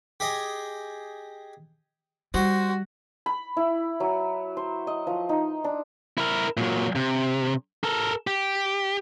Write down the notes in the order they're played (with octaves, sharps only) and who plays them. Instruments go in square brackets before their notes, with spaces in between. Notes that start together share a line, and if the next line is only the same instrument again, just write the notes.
[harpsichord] G4 G#4 D#5
[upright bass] G3 [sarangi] F#4 [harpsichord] C5 D#6
[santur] B5
E4
F#3
C5
D#5
F3
D#4
D4
[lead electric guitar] E4 A#4
A#2 F#3
C3
A4 A#4
G4